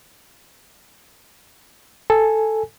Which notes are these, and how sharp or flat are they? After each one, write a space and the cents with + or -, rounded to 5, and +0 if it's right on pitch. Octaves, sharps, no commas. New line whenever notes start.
A4 +0 G#5 +0